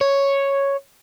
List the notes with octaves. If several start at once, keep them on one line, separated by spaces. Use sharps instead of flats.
C#5